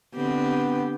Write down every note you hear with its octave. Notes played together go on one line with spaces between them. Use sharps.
D3 B3 C4 G4